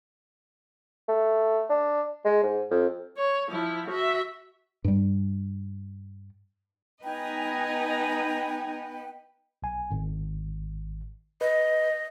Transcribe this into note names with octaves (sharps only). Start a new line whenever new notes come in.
A3
D4
G#3
G#2
F2
C#5
F3 E4
F#4 E5
G2 G3
B3 D#4 B4 D#5 G5 G#5 A#5
B1 G#5
G#1
B4 D#5